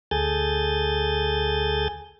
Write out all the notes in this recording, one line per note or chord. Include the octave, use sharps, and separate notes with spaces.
D2 G#4 A4 G#5 G6 A6